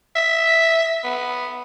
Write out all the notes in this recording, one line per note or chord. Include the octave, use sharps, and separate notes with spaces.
E5
B3